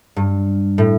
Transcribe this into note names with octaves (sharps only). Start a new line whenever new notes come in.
G2
A2